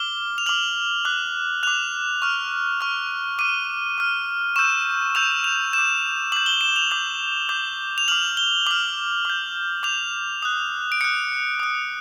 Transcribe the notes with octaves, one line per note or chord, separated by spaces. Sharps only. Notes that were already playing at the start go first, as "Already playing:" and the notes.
Already playing: D6 F6 G7
F7
D6 F6 F#7
D6 F#6
D6 F#6 F7
C#6 F6
C#6 F6
D6 F6 D#7
D6 F6
C#6 E6 G6 E7
C#6 E6 G6 F7
F7
D6 G6 E7
D6 G6 F#7
G7
E7
F7
D6 G6
D6 G6
F7
D6 F6 F#7
G7
D6 F6 F#7
D6 G6
D6 G6 F7
D#6 F#6
D7
D#6 F#6 C#7
D#6 F#6